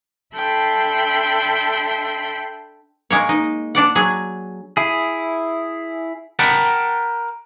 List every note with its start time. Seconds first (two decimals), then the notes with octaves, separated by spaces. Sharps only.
0.34 D4 A4 E5 G5 B5 C6
3.10 G#3 A#3 C#5
3.29 D#4
3.75 D4 D5 F#5
3.95 F#3 G#4
4.77 E4 G#4
6.39 A#4 F#5 G5 A5 B5